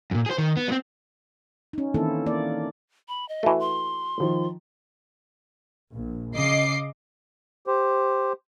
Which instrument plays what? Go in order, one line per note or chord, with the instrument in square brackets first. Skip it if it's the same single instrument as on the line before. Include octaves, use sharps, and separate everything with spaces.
[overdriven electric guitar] F#2 A#2
G#4 C5
D#3
B3
G3 C4
[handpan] C#4 D#4
D#3 E3 A#3 C4 E4 A4
A#3 D5
[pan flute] B5
D#5
[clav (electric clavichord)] E3 A3 [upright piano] F#4
[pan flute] C6
[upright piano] D#3 F3
[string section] A#1
C#3 D#5 D6 C7
[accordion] G4 C5